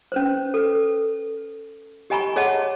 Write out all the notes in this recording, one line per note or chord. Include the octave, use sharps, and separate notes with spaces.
C#4 B4 C5
A4 B4
G4 D#5 G#5 A#5 B5 C#6
G#4 C#5 D#5 F#5 A5 C6